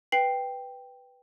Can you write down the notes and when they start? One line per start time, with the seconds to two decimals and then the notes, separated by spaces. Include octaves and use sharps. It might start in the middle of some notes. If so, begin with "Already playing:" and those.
0.12 B4 G5 C7 F#7